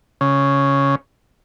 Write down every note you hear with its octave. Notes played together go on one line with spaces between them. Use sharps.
C#3